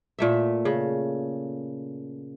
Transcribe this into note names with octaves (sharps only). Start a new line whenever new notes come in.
A#2 A3 E5
C#3